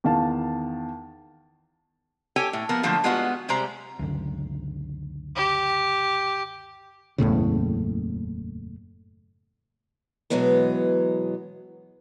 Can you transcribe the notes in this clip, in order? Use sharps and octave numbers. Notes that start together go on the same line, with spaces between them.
E2 D#3 F5 A5
G4 A4 C#5 G5 G#5
A2
F3 B3 A#4
D3 F3 F#3 A3 A#3
G3 G#3 B3 F4 F#4 F#5
C3 G3 G#3 C5 A#5
C#2 F#2 D3
G4
F#1 E2 A2 C#3
B2 E3 F#3 G#3 B3